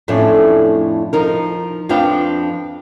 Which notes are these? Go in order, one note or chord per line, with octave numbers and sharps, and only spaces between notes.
F2 A2 A3 C#4 D4
F3 D#4 A#4
F2 F3 D4 B4 F5 G5